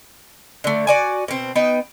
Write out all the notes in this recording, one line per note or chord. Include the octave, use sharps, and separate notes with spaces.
D3 A3
F#4 D5 G#5
B2 C4
B3 D#4 G5